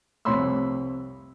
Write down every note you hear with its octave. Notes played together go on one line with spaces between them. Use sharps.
C2 F2 C#5 B5 C6 E6